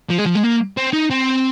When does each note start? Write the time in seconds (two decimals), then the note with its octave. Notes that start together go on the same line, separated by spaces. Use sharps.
0.10 F3
0.18 G#3
0.26 F3
0.35 G#3
0.43 A#3
0.77 C4
0.93 D#4
1.10 C4